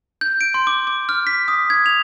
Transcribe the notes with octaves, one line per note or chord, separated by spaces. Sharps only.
G6
D7
C6
D6
D6
F6
B6
D#6
G#6
F7